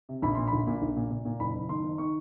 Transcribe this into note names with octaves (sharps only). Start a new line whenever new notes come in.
C3
A#1 B5
A#2 C6
B5
A#1
A#2
A#1
A#2
A#2
A#2
F#1 B5
F#1
D#3 C6
D#3
D#3 C#6